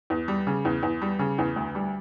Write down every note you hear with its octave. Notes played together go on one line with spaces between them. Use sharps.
E2
G3
C#3
E2
E2
G3
C#3
E2
D2
G3